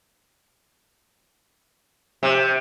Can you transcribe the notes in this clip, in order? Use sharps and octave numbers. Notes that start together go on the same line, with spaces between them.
C3